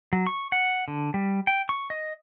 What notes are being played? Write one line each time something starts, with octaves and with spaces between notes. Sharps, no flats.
F#3
C#6
F#5
D3
G3
G5
C#6
D#5